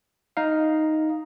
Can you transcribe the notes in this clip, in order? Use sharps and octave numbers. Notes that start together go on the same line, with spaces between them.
D#4 F5